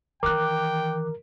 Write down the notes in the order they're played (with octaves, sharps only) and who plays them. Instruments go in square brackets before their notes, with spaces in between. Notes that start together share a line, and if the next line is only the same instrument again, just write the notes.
[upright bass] D#3 E3 [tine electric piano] A#4 [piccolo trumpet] G5 [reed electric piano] D6 F#6